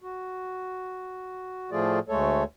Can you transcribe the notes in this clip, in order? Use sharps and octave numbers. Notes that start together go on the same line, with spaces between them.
F#4
A2 F3 A3 F4 G#4 D5
D2 G#3 A3 A4 C#5